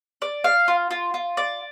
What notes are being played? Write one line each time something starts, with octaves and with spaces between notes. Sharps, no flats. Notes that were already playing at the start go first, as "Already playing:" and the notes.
D5
F5
F4
F4
F4
D5